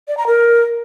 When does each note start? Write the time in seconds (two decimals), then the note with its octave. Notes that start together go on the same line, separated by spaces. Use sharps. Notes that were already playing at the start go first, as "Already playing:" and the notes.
0.08 D5
0.17 A#5
0.27 A#4